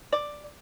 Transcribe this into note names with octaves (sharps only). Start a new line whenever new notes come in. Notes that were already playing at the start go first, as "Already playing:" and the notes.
D5